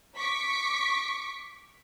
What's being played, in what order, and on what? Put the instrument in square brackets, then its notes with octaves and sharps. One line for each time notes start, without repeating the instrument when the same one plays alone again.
[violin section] C#6 D6 B6